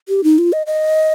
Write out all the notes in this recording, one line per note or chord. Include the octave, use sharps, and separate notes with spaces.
G4
D#4
F4
D#5
D#5